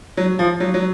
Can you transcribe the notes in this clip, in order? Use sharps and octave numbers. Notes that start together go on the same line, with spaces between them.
F#3
F3
F#3
F#3